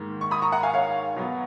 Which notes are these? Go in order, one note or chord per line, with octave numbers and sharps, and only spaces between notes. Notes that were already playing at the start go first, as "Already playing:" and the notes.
Already playing: G#2 D#3 A#3
C#6
B5 D#6
A#5 C#6
F#5 A#5
F5 G#5
C#5 F5
B2 F#3 B3